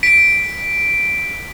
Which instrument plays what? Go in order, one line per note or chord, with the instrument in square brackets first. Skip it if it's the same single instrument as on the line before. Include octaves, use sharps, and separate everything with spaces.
[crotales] B6 D7